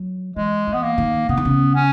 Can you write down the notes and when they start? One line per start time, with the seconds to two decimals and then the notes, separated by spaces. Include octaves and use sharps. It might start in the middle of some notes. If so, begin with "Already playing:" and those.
Already playing: F#3
0.36 E3 G#3
0.67 E3
0.73 B3
0.83 A#3
0.98 D#3
1.29 C#3 B3
1.37 D#3
1.45 C#3
1.75 C#4